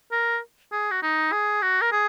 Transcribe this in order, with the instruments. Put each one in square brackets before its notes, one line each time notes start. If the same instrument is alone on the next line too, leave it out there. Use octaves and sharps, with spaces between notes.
[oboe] A#4
G#4
F#4
D#4
G#4
F#4
A#4
G#4